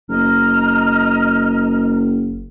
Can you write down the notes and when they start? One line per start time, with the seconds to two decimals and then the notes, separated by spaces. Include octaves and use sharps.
0.09 F#1 D#5 A#5 F6